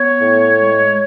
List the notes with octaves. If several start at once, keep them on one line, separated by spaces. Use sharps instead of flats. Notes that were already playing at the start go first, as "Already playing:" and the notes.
Already playing: B3 C#5
A2
G#3